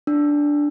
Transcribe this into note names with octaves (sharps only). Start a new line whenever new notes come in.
D4